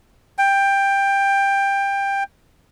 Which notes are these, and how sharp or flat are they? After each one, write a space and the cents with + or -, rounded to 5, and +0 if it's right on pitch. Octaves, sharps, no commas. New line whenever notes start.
G5 +15